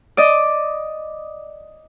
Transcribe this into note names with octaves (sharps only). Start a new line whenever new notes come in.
D5 D#5